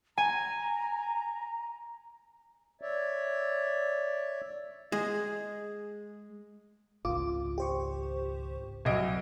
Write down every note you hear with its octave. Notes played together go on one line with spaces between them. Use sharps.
G#5 A#5
C#5 D5 E5
G#3 G#4
G#1 C#2 F4 D6
G4 C5 C#6
C2 F#3 D#5 E6 G#6 D7